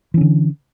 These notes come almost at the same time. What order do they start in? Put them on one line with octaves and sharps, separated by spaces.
E3 C#4 D3